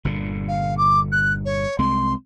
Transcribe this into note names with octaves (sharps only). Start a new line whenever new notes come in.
G1 A#2 D3
F5
D6
F#6
C#5
C2 G#3 C4 C6